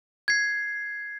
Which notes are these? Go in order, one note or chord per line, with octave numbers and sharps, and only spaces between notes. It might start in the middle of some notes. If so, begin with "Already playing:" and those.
G#6 C7